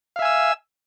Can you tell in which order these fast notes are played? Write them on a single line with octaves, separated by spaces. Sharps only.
F5 E5 G#5 E6